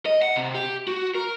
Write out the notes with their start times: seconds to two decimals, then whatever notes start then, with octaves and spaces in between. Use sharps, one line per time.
0.06 D#5
0.22 F#5
0.36 C3
0.54 G4
0.87 F#4
1.15 A#4